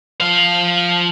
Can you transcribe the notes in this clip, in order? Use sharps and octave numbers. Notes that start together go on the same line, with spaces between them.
F3 F5